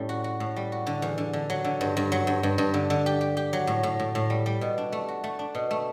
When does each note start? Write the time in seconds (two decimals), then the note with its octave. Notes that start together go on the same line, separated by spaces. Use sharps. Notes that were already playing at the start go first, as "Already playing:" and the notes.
Already playing: A2 G3 C#4
0.09 F#4
0.24 F#4
0.40 A2
0.56 G3
0.72 F#4
0.87 D3
1.02 E2
1.18 D3
1.33 D3
1.50 F#3
1.65 D3
1.81 G2
1.97 G2
2.12 F#3
2.27 G2
2.43 G2
2.58 G2
2.74 D3
2.90 D3
3.06 G4
3.21 G4
3.37 G4
3.53 F#3
3.67 A2
3.83 A2
4.00 A2
4.15 A2
4.30 G3
4.46 G3
4.61 B2
4.78 D4
4.92 A3
5.08 F#4
5.24 A3
5.39 D4
5.55 B2
5.71 A3